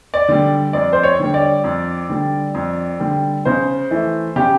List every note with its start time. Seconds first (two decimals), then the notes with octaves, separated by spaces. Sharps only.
0.14 D5
0.28 D3 G3
0.73 F2 D5
0.93 C5
1.03 C#5
1.20 D3 G3
1.34 D5
1.64 F2
2.10 D3 G3
2.55 F2
3.00 D3 G3
3.45 C#3 C5
3.91 E3 A3
4.36 C#3 G4